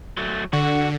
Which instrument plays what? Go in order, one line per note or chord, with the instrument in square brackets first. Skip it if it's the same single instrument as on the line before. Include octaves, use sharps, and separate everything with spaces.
[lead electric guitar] F#3 A3
[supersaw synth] D3 [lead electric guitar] F#4